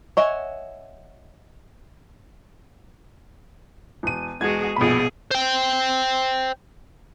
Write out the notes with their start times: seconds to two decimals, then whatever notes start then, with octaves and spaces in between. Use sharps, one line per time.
0.17 C#5 D#5 E5 F#5 G#5
4.03 E1 D#7
4.41 E1 G#3 F#4 G#4 G#6
4.76 A#1 B2 G#4 B5
5.31 C5 G5